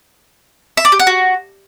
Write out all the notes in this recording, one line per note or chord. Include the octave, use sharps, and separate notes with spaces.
E5
D5
G4
F#5
F#4